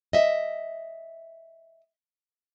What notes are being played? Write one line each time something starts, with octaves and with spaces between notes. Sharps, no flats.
D#5 E5